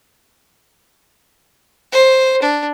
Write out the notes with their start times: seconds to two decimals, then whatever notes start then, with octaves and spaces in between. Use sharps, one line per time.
1.92 C5
2.42 D4